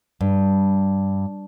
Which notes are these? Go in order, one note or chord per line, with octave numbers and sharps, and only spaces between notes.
G2